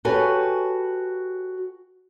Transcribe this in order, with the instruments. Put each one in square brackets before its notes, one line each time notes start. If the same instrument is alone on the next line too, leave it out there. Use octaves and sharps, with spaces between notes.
[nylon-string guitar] F#4 G4 A4 B4 C#5 G#5